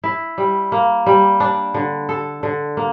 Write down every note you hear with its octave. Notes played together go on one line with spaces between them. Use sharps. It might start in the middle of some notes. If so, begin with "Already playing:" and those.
E4
G3
A#3
G3
D4
D3
A4
D3
A#3